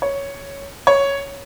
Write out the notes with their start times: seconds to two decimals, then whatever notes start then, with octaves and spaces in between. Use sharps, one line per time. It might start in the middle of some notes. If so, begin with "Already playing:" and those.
0.02 C#5
0.87 C#5